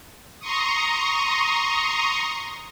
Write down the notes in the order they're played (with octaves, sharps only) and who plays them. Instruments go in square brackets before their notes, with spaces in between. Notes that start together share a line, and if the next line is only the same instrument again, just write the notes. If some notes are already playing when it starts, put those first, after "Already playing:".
[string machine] A#5 C6 C#6 D#6